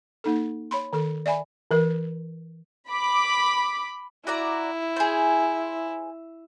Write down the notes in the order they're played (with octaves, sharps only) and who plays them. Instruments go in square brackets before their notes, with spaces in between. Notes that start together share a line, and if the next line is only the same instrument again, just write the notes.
[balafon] A#3 D#4 A4
C#5 B5 C6
D#3 A4
D5 E5 G#5 B5
E3 A#4
[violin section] B5 D6
[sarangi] E4 [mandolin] F#4 D5 A#5
[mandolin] G#4 C5